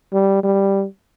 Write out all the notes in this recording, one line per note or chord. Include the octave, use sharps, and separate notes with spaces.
G3
G3